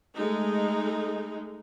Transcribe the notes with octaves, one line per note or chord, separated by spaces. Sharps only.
G#3 A3 D#4